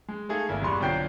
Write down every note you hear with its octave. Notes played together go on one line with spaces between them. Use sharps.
G#3
A3 D#4 G#4 A4 F5
G#1 A#3 E4
E1 G2 C6 C#6
B1 D3 F3 G5 G6 C7